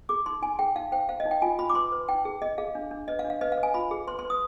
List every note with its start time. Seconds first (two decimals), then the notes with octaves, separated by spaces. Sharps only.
0.09 G#4 D6
0.26 D#4 C6
0.42 D#4 G#5
0.59 G#4 G5
0.76 D#4 F5
0.92 C5 G5
1.09 C5 F5
1.20 D#5
1.25 D#4
1.31 G5
1.42 F4 G#5
1.59 F4 B5
1.70 D6
1.75 B4 C6
1.92 B4
2.09 D#4 G5
2.25 G#4
2.42 G#4 D#5
2.58 G#4 F5
2.75 D4
2.91 D4
3.08 B4 D#5
3.19 F5
3.24 D4
3.30 F5
3.41 B4 D#5
3.52 F5
3.58 B4
3.63 G#5
3.74 F4 B5
3.91 G#4
4.07 B4 C6
4.19 C6
4.24 B4
4.30 D#6